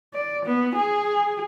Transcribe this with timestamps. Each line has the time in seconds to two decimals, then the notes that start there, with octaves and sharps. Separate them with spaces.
0.14 D5
0.45 B3
0.75 G#4